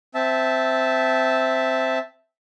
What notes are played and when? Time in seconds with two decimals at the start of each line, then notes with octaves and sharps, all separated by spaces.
0.15 C4 E5 A5